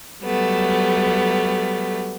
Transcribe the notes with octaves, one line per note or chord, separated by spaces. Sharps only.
F#3 G3 A3 B3